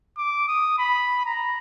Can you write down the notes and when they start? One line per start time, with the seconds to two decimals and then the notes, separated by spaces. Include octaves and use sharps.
0.17 D6
0.48 D#6
0.79 B5
1.26 A#5